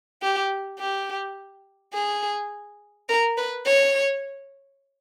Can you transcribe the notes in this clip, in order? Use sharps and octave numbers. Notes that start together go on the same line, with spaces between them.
G4
G4
G#4
A#4
B4
C#5